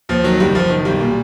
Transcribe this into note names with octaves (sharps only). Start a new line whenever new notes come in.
D#2 F3
D#3 F#3
F#1 G3
F#1 F3
D#3
B1 G3
A#2